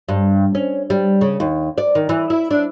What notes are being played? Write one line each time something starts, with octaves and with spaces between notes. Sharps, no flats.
G2
C#4
G3
C#3
D#2
D5
D#3
E3
E4
D4